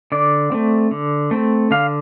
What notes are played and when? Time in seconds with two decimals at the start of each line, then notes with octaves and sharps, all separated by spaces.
0.12 D3 D5
0.52 A3 C4
0.91 D3
1.31 A3 C4
1.71 D3 F5